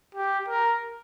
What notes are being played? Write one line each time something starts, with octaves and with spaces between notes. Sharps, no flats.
G4
A#4